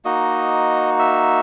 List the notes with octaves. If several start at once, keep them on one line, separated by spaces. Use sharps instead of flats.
A#3 D#4 F#4 D#5
E5